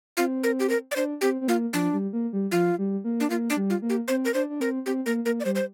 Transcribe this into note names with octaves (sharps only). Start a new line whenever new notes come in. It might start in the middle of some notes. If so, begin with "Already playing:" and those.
C4 F4
A#4
G4
A#4
D5
D4 C5
C4 G4
C4
A#3 F4
F3 D4
G3
A#3
G3
F3 F4
G3
A#3
D4
A#3 F4
D4
G3
F4
A#3
G4
C4 C5
A#4
D4 C5
D4
C4 A#4
C4 G4
A#3 A#4
A#3 A#4
D5
G3 C5
C5